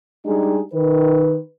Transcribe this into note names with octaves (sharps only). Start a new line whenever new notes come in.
G3 G#3 D4 D#4 G4 G#4
D#3 B4